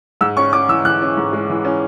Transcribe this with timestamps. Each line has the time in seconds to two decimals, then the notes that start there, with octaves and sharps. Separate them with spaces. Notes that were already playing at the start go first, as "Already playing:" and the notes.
0.21 G#2 E6
0.37 C#4 C#6
0.53 C#4 D6
0.69 E3 E6
0.85 E3 F#6
1.02 C#4
1.17 G#2
1.33 G#3
1.50 E3
1.65 C#4